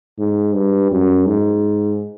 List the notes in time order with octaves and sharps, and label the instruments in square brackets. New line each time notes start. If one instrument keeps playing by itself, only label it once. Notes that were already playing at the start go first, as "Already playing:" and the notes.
[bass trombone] G#2
G2
F#2
G#2